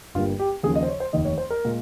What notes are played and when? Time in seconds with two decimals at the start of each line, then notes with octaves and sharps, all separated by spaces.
0.14 G1 G2 G3 A#3 F4
0.40 G4
0.63 D#2 C#3 F3 A#3 G#4
0.76 D#5
0.83 C5
0.88 C#5
1.00 C5
1.13 F1 D#2 D#3 D#5
1.25 C#5
1.38 C5
1.50 A#4
1.65 A#2 G#3